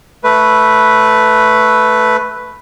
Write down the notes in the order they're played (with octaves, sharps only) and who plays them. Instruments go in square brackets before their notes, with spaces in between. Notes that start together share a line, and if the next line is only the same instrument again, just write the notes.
[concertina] A3 B4